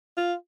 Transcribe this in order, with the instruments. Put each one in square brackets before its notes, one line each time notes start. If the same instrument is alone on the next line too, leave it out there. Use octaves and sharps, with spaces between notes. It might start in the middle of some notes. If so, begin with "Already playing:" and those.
[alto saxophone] F4